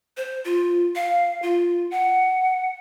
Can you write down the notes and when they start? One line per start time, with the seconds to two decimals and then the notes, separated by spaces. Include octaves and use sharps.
0.17 C5
0.45 F4
0.95 F5
1.42 F4
1.91 F#5